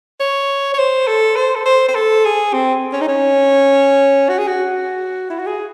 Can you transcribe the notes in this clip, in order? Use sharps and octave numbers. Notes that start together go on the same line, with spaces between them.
C#5
C#5
C5
A4
C5
A4
C5
C5
A4
G#4
C4
C#4
D#4
C#4
F#4
G#4
F#4
E4
F#4
G#4